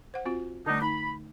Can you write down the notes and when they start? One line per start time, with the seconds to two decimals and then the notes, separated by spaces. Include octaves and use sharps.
0.14 C5 F#5
0.26 C4 F4 F#4
0.66 D3 G3 A3 D4 D#4
0.82 D#4 B5